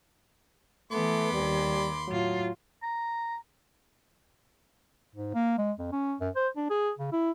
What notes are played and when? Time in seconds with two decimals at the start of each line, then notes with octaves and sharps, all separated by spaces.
0.92 E3 A3 B3 B5 C6 D6
1.33 D#2 G3
2.08 A2 F#3 F4
2.83 A#5
5.14 G#2
5.34 A#3
5.58 G#3
5.79 F2
5.92 C#4
6.20 F#2
6.35 C5
6.56 D4
6.70 G#4
6.98 C#3
7.12 E4